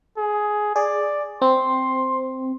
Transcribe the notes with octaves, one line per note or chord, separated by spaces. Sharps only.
G#4
G#4 D5
C4 C6